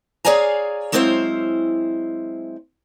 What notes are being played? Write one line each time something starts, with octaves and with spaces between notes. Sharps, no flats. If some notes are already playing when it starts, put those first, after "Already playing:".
G#4 C#5 D5 F5 G#5 A#5
F#3 G#3 C4 E4 C5 F5